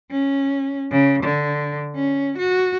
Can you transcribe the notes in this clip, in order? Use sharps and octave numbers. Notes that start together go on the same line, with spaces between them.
C#4
C#3
D3
C#4
F#4